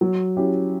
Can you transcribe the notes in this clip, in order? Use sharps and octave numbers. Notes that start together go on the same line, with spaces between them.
F#3
C#4 E4 G4